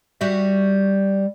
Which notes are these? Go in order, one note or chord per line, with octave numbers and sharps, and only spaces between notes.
G3 F#4 E5